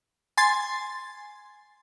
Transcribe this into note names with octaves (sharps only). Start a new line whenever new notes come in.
G#5 C6 A6